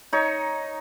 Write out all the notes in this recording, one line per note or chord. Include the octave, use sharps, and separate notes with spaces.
D#4 C#5